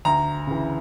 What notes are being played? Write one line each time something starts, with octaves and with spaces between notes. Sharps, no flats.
D2 A#5
C#3 E3